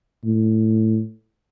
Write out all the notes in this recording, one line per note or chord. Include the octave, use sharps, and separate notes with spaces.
A2